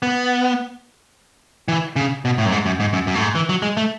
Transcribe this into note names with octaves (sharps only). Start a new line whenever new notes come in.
B3
E3
C#3
B2
A2
F#2
G#2
F#2
G#2
F#2
F#2
A2
G#2
E3
F#3
G#3
A3